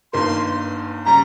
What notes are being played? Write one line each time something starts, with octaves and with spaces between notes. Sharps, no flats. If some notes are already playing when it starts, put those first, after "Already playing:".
G1 G2 D#3 A#3 C6
C#3 G3 C#4 A#5